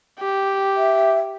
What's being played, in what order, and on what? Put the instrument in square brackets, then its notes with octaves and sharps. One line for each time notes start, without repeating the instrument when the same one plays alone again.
[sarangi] G4
[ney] E5